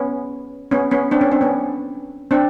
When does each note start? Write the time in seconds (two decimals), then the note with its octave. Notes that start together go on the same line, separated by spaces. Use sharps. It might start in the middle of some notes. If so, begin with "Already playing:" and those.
Already playing: B3 C#4
0.71 B3 C#4
0.91 B3 C#4
1.11 C4 D4
1.21 B3 C#4
1.31 C4 D4
1.41 B3 C#4
2.31 C4 D4